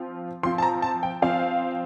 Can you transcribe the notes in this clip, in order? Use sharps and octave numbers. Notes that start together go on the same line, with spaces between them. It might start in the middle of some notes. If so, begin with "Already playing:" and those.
Already playing: F3 C4 F4
F3 C4 F4 C6
A5
A#5
A5
G5
F3 C4 F4 F5